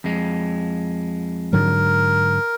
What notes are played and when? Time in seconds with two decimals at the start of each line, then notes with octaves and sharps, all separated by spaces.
0.04 F2 G#3
1.53 G#2 D3 F#3 A#4